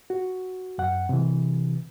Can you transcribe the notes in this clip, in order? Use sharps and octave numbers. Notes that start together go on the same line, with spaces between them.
F#4
F#2 F#5
C3 E3